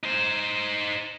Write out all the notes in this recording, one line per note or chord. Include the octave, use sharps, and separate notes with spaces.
D#4 C5